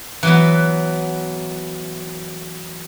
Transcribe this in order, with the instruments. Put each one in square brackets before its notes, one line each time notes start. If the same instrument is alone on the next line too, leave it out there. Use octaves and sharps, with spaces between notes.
[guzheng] E3 F#3 B3